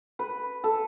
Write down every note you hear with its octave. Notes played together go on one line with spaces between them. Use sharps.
B4
A4